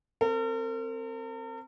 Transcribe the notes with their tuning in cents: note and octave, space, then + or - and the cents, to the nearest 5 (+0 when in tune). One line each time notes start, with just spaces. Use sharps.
C4 +0 A#4 -45